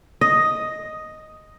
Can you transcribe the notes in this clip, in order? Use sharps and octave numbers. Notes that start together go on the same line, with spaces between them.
D#5